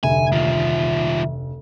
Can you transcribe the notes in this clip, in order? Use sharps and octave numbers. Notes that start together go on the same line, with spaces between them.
F1 D2 E5 G#5
D#3 F4